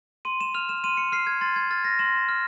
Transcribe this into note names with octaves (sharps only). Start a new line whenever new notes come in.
C6 D#7
E7
F6 F7
E7
C6 D#7
C#7
F6 C7
G#6
C6 A6
G#6
F6 A6
A#6
C6 E7
F6